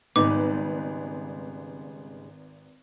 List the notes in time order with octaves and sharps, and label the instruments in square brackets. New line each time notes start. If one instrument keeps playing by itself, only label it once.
[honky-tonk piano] G#1 B4 [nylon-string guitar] G#2 C#3 G3 [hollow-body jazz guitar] B3 D#4 [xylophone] D6